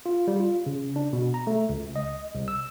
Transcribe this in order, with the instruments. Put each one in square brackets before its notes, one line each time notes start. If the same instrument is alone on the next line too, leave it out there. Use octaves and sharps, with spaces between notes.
[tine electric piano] F4
G3
F4
C#3
D4
B2
A#5
A3
C#2
D#5
C2
E6